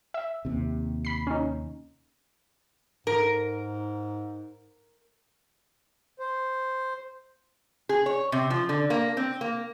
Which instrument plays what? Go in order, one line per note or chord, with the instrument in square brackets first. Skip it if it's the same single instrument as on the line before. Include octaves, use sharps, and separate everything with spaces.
[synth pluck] E5
[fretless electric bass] D#2 C3
[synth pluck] B5 C7
C#4 D#4
[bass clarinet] G#2 [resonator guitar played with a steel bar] A#4
[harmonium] C5
[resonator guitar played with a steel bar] G#4
C#5
C3
F3
D3
A#3
C4
A#3